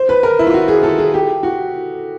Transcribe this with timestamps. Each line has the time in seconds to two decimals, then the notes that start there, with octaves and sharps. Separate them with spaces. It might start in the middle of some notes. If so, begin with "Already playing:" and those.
Already playing: C5
0.09 B4
0.23 A#4
0.39 E4
0.47 F4
0.54 F#4
0.68 G#4
0.83 A4
0.98 G#4
1.14 G4
1.43 F#4